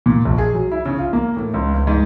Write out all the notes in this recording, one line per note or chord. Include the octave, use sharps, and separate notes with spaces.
A#2
A#1
G#4
F#3
E4
C#3
F4
A#3
A2
C#2
C#2
G#2